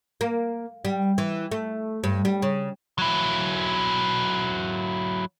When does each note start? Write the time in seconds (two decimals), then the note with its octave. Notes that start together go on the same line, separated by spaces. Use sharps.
0.21 A#3
0.85 G3
1.18 E3
1.51 A3
2.04 G2
2.25 G3
2.42 C#3
2.99 F#3 E4